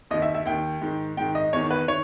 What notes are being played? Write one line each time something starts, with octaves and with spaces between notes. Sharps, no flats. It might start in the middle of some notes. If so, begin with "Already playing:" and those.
D#2 D#3 D#5
E5
E5
D#2 D#3 G5
G#2 D#3
G#2 D#3 G5
D#5
E2 D#3 C#5
B4
D#3 C#5